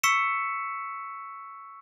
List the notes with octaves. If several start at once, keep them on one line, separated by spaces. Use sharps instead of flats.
C#6 E6 B6 C#7 E7